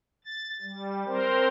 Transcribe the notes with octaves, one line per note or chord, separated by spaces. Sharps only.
A6
G3
C4 A#4 C5